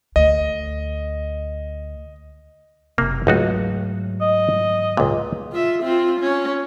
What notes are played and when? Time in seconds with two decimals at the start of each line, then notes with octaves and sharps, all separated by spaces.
0.16 D2 D#5
2.98 F#1 C3 A#3
3.27 C#2 G#2 F#3 A3 D#4 F#4
4.21 D#5
4.97 C#2 A#2
5.52 F4 E5
5.83 C4 F4
6.20 C#4